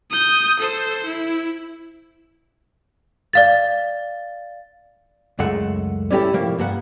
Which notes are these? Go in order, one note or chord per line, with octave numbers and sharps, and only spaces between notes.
D#6 G6
A4 C5
E4
D5 F5 A6
C#2 F#2 G#3 A3 F#5
G3 C#4 E4 F#4 G4 A4
A2 C3 F3 G3 A#3
G2 A#3 B3 F#5